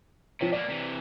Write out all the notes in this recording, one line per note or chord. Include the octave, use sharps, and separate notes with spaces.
C3 F3 C#5
B2 A#3 D5
C3 E3